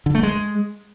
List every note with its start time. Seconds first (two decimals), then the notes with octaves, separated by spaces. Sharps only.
0.06 D3
0.15 A3
0.23 G#3